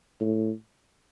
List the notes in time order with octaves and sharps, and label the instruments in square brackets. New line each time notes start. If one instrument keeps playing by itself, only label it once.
[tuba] A2